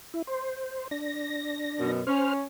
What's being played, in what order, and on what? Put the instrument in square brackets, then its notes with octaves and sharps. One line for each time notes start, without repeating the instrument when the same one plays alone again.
[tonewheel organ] E4
C5
D4 A#6
[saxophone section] F#2 B2
[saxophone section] C#4 [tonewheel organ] C5 F6